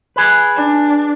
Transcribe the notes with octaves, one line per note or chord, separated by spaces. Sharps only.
G#4 B4
D4